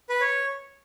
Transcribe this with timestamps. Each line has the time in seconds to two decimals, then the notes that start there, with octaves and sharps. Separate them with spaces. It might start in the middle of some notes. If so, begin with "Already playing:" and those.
0.09 B4
0.21 C#5